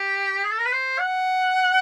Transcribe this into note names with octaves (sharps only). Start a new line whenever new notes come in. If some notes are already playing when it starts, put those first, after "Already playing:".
Already playing: G4
G#4
A4
A#4
B4
C5
F#5